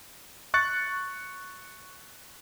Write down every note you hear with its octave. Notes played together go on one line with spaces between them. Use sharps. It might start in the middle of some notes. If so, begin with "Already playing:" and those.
C#6 F#6 A6 C#7